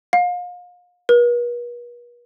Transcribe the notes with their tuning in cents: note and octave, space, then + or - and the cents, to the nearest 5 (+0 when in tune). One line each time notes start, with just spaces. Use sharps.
F5 +35
B4 -45